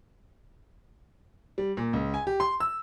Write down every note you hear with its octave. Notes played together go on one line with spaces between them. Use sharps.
G3
A#2
C#2
G#5
G4
C6
E6